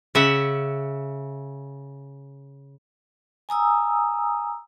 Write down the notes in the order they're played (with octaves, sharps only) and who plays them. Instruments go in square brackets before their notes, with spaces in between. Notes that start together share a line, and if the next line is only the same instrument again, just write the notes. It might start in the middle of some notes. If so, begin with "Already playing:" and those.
[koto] C#3 E5 F#5
[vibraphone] G#5 A#5 D#6 E6